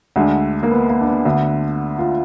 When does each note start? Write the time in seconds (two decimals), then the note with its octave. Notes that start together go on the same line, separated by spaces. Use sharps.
0.16 D2 D3 G#3
0.63 A#3
0.71 B3
0.89 A#3
1.01 D4
1.07 B3
1.25 D2 D3
1.99 F4